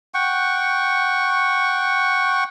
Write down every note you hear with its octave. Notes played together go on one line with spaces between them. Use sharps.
F#5 G5 C#6